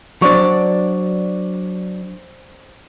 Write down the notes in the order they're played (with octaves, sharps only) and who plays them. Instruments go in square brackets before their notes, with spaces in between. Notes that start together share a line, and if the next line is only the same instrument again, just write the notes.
[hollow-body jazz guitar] F#3 D4 [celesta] C5 D5 C#6